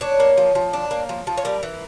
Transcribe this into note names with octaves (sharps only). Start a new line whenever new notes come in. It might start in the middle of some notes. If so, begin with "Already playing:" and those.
D4 C#5
A#3
F3
F3
D4
A#3
F3
F3
C#5
G3 A#4
E3